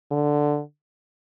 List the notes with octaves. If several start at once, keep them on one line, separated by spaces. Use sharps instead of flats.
D3